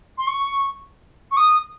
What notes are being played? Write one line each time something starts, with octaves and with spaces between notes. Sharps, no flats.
C6
C#6
C#6
D#6